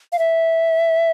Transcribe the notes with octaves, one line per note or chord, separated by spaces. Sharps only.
F5
E5